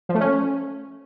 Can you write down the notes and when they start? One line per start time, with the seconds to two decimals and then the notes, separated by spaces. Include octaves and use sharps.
0.09 F3
0.15 A3
0.20 C#4